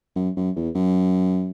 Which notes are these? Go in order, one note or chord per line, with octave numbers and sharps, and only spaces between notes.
F#2
F#2
E2
F#2